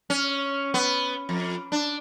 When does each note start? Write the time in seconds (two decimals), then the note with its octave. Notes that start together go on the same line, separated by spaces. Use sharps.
0.10 C#4
0.74 B3
1.29 F2
1.72 D4